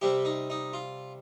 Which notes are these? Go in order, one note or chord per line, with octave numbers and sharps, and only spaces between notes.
C3 G3 C4 G4
D#4
D#4
F4